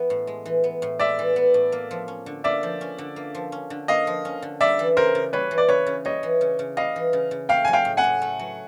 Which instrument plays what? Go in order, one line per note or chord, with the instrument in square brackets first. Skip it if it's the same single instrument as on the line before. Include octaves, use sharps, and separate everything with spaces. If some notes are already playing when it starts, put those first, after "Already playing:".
Already playing: [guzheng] E3 B3
A2
G#3
E3
B3
A2
[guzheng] G#3 [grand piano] D5 E5
[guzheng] E3
B3
A2
A#3
F3
C#4
D3
[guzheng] A#3 [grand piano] D5 E5
[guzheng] F3
C#4
D3
A#3
F3
C#4
D3
[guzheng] A#3 [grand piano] D#5 F5
[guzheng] F3
C#4
D3
[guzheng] G3 [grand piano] D5 E5
[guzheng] E3
[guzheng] C#3 [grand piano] A#4 C5
[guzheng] C#3
[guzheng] G3 [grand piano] B4 C#5
[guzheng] E3
[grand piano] D5
[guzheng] C#3 [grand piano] B4 C#5
[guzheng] C#3
[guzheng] G3 [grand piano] C#5 D#5
[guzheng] E3
C#3
C#3
[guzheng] G3 [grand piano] D#5 F5
[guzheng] E3
C#3
C#3
[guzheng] A3 [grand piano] F5 G5
[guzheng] F#3 [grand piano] G#5
[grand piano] F5 G5
[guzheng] A2
[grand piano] F#5 G#5
[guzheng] A2
A3
F#3